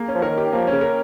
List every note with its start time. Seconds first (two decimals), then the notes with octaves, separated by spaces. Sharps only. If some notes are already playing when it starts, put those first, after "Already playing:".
Already playing: A#3 G#4
0.08 C#4
0.15 F3
0.22 D#3 A#4
0.38 G4
0.53 F3 A#3
0.67 C#4
0.72 C#3
0.81 A#4